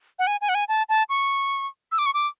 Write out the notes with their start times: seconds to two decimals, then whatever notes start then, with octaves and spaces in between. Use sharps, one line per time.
0.19 F#5
0.27 G#5
0.41 G#5
0.49 F#5
0.55 G#5
0.69 A5
0.89 A5
1.09 C#6
1.92 E6
1.98 D6
2.06 C#6
2.14 D6